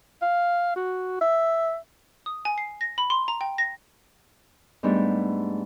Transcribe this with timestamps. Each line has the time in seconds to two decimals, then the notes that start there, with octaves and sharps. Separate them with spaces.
0.22 F5
0.76 F#4
1.21 E5
2.26 D#6
2.45 G#5
2.58 C7
2.81 A#6
2.98 B5
3.10 C6
3.28 A#5
3.41 G5
3.58 A#6
4.83 G#2 G3 A3 B3 D4